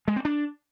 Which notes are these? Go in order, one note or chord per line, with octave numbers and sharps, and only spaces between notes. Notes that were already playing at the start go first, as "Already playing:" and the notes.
G#3
C4
D4